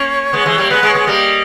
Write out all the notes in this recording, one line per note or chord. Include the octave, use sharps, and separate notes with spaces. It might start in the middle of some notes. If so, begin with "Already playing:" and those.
Already playing: A#3 C#4 C#5
G#3 B3
E3 G#3
G3 A#3
G#3 B3 B4
G#3 B3
C#5
G#3 B3
G3 A#3 D#5